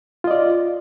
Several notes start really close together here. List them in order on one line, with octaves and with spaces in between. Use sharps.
F4 D#5 D5